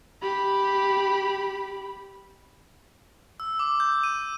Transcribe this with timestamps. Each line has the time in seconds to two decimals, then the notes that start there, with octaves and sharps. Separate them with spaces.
0.22 G4 B5
3.40 E6
3.59 D6
3.80 G6
4.03 D#7